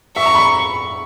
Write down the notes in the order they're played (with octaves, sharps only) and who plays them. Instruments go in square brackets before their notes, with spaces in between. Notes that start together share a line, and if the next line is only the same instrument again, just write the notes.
[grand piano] E5 [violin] C#6
[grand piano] A#5
B5